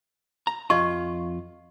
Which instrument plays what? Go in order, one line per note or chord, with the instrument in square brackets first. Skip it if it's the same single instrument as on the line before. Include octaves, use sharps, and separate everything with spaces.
[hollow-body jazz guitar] A#5
[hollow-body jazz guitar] F2 F4 [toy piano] D#5 C#6